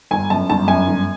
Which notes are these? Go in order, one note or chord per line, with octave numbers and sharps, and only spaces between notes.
G1 G#5
F#2 A5
G1 A5
F#2 G#5
G1